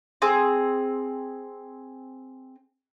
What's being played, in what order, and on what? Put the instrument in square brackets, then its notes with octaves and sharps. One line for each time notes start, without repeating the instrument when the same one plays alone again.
[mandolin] C4 G#4